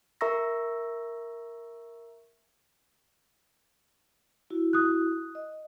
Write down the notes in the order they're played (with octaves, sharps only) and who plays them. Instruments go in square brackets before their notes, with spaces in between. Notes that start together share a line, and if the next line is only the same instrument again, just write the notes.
[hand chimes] A#4 E5 A#5 C#6 E6 A#6
[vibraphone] E4 F#4
[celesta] D#6 F#6
[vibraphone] D#5